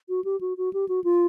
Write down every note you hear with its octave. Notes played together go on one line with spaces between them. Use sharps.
F#4
G4
F#4
F#4
G4
F#4
F4